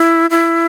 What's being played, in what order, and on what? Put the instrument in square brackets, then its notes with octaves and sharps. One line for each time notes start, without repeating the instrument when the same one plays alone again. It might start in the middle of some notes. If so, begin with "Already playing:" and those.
Already playing: [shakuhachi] E4
E4